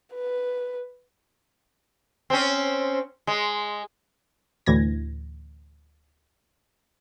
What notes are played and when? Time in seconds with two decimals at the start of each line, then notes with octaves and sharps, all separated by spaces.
0.14 B4
2.30 C4 C#4
3.27 G#3
4.66 D2 A2 E3 G#6 A#6